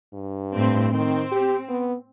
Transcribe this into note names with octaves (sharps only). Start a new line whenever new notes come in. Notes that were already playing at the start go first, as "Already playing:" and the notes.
G2
A2 C4
D#3 C4
G4
B3